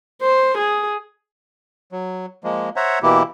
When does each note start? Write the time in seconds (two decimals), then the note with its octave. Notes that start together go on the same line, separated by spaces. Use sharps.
0.21 C5
0.58 G#4
1.92 F#3
2.44 F3 G#3 A#3
2.76 C5 C#5 E5 F#5 A#5
3.03 B2 E3 A#3 E4 G4